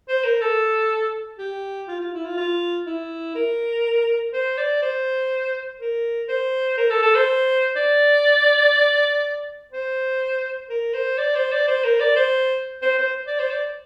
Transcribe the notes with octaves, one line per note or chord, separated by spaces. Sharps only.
C5
A#4
A4
G4
F4
F4
E4
F4
F4
E4
A#4
C5
D5
C5
A#4
C5
A#4
A4
A4
C5
D5
C5
A#4
C5
D5
C5
D5
C5
A#4
D5
C5
C5
C5
D5
C5
D5